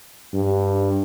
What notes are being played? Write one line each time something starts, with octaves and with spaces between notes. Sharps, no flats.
G2